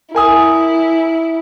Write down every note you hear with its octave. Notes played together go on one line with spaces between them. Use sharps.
E4 A#4 G#5 D#6